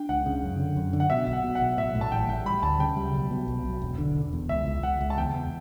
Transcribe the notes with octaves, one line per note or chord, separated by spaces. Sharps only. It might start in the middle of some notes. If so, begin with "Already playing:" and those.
Already playing: D4 G5
C#2 F#5
C#3
F#2
D3
F#2
D3
F#5
B2 E5
B1
F#5
B2
F#5
B1
A2 E5
A2
A5
A1 G5
A1 G5
G3 B5
D2 A5
C#3 G5
G3
B1
B2
B1
B1
E1
D3
E1
E2
C#2 E5
C#2
C#2 F#5
C#2
A5
E2 G5
E2